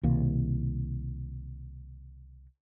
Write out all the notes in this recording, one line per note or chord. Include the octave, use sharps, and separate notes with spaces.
C2 B2 D#3 A#3